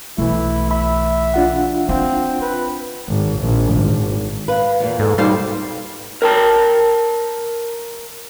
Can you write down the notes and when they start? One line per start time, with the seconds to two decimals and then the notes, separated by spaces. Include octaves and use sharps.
0.18 B1 E3 A3 E4
0.71 E5 B5
1.34 D4 F4 F#5
1.89 C4 E4 F5 G5
2.42 B4
3.09 G#1
3.40 A#1
3.75 G#1
4.48 B4 F5
4.80 E2 A#2
4.99 G#2 A4
5.18 B2 G3 D#4 C5 F5
6.22 A#4 G5 A5